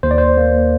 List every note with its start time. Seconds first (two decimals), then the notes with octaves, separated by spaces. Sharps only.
0.03 D#2 C5
0.11 D5
0.18 C5
0.37 A#3